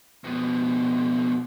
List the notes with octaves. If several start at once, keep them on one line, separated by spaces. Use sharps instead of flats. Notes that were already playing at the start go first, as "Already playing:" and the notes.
F2 B2